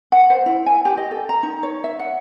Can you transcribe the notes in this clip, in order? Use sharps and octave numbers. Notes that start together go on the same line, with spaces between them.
F#5
C5
E4
G#5
G4
D#5
A4
A#5
D#4
C#5
E5
F#5